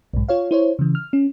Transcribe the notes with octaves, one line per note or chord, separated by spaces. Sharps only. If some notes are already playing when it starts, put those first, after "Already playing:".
B1 G#2
F4 C#5 F5
E4 C5 C#5
C#3 E3
F6
C#4